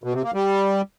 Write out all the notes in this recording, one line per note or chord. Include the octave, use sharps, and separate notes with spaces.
B2
C3
A#3
G3